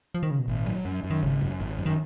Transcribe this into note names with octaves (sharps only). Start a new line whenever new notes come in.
F3
D#3
C#3
B2
G#1 A#2
F#3
F#2
F#2
D#3
G#1 C#3
F#2
G#1
F#2
D#3